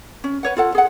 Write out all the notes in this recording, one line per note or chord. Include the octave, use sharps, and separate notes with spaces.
C#4
B4 C#5 F#5
F4 A4 F#5
G#4 F#5